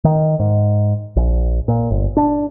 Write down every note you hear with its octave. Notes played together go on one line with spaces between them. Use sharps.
D#3
G#2
A#1
A#2
G1
D4